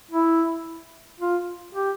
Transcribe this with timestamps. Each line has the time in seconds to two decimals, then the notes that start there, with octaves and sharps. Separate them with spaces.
0.11 E4
1.20 F4
1.75 G4